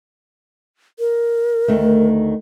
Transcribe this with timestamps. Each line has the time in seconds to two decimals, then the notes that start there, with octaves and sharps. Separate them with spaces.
0.99 A#4
1.68 D2 D#3 A3